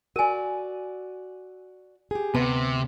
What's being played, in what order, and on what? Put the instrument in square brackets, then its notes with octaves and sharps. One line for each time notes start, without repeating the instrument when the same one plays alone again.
[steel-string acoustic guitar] F#4 D5 [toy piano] A#4 G#5
[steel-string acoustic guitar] G4 G#4
[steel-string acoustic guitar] D2 [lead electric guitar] C3 [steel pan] B3 [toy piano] A5